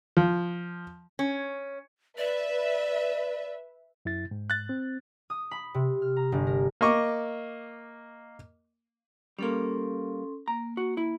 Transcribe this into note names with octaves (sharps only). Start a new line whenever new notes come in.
F3
C#4
B4 D5 E5
F#2 E4 A6
G#2
F#6 A6
C4
D#6
B5
C3
F6
A#5
G1
A#4
A#3 D#5 C#6 D6
G3 A#3 C#4 A4 C6
A#3 A#5
F#4
E4